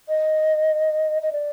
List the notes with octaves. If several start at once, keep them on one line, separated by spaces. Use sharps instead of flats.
D#5
D#5
D5